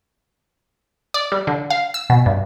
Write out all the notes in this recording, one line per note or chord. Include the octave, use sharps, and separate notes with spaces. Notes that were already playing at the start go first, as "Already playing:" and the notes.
D5
G3
D3
F5
E6
B2
G2